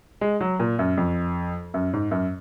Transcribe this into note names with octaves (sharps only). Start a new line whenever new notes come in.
G#3
F#3
A#2
F#2
F2
F#2
G#2
F#2